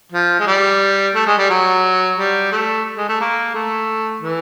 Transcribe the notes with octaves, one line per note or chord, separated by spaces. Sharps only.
F3
G#3
G3
A3
G#3
G3
F#3
G3
A3
G#3
A3
A#3
A3
E3